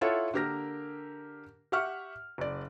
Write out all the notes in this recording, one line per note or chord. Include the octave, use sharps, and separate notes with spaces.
E4 F4 A4 C#5 F#5
D3 A#3 G4 A#4 A#6
G4 E5 F#5 C#6 F6
F#1 D5